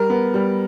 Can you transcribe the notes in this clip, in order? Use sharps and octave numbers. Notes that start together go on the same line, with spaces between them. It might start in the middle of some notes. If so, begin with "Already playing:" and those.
Already playing: G3 A#4
B3
G3